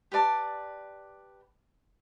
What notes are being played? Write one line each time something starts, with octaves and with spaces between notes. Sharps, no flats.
G4 B4 D5 A5